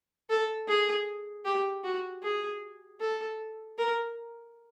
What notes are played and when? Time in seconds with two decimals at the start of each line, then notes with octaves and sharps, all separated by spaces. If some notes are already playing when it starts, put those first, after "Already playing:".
0.30 A4
0.68 G#4
1.45 G4
1.84 F#4
2.23 G#4
3.01 A4
3.78 A#4